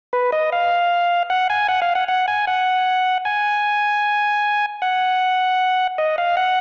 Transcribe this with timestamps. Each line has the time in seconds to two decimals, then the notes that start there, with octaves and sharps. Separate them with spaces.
0.13 B4
0.32 D#5
0.52 F5
1.30 F#5
1.50 G#5
1.68 F#5
1.82 F5
1.95 F#5
2.08 F#5
2.28 G#5
2.47 F#5
3.25 G#5
4.82 F#5
5.98 D#5
6.18 F5
6.37 F#5